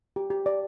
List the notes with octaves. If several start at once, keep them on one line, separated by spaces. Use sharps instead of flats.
G4
G4
D5